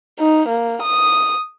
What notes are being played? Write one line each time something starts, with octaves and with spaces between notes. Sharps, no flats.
D#4
A#3
D#6